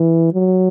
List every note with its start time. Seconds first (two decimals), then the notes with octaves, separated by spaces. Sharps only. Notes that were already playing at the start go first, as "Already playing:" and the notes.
Already playing: E3
0.34 F#3